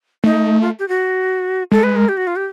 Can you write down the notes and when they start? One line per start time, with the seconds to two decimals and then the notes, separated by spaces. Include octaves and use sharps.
0.24 A3 D#4
0.61 F4
0.79 G4
0.88 F#4
1.71 G#3 A4
1.83 B4
1.96 A#4
2.09 G4
2.17 F#4
2.27 F4
2.36 G4